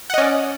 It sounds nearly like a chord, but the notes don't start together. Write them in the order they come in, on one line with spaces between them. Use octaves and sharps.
F#5 D#5 C#4 D5